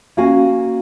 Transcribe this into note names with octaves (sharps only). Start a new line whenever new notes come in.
A#3 C#4 F#4 F5 G#5